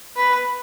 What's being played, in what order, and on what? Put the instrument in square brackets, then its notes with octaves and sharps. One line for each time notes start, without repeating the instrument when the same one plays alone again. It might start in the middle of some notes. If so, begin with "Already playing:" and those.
[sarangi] B4